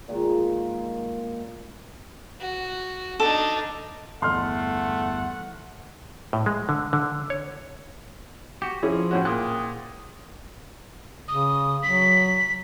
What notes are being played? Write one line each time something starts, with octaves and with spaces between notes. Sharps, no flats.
A#2 D#3 G#3
F#4
D4 D#4 A4
G1 E2 A3 F#5 C6 F6
A2
G#3
D3
D3
C#5
F#4 G4
F3 C#4 E4 G#4
A2 C#4 F#4
A#2 G5 D#6 F#6
C#3 D#6
F#3 B6